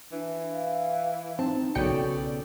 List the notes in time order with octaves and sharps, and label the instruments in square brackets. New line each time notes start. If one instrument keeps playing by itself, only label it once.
[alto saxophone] E3 [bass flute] D4
[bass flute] F5
[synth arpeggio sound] C4 [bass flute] D#4 [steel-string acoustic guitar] A5
[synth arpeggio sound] B1 G5 C#7 [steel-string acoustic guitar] C#3 B3 A4 [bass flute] F#4 [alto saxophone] D5